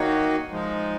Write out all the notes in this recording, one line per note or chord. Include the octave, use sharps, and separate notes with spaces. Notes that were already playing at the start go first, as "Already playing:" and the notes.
Already playing: D#3 A#3 D#4 F#4 C#5
F3 G#3 D#4